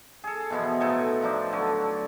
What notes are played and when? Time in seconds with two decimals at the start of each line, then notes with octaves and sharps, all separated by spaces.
0.24 G#4 A4
0.50 B2 E3 F3 B3
0.80 A2 D#4 A4 G#5
1.22 F3 D4 D#4
1.52 D3 F#3